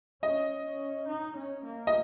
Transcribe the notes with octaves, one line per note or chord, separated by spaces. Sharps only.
C#4 D#5
C#4
D#4
C#4
A#3
D#5